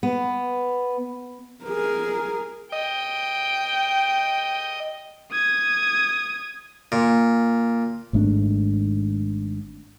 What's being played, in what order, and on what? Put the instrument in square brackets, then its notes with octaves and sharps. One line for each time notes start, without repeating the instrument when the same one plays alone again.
[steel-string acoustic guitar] B3
[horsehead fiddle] G#4 A#4
[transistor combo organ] D#5 [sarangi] G5
[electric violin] D#6 G#6
[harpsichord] A#2
[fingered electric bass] G#1 G#2 A3 D4